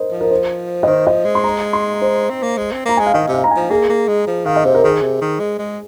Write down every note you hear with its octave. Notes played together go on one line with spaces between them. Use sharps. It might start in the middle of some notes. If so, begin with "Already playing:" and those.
Already playing: A#4 C5 D#5
F3
A#4
C5
D#5
D#3 C5
F3 D#5
G#3
C6
A#5
C6
C5
C4
A#3
G#3
C4
A#3 A#5
G#3 G#5
F5
D#3 D#5
C3
F5
A#5
G#5
F3
A#3 G#4
A#3
G#3
F3
D#3 F5
D#5
C3 C5
A#4
D#3 G#4
C3
D#3
G#3
G#3